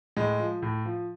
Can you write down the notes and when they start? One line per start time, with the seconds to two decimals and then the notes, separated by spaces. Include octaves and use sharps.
0.17 A2 G#3
0.40 F3
0.62 A2
0.85 F3